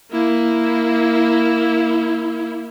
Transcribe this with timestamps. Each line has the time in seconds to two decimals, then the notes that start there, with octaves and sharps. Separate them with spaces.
0.11 A#3 E4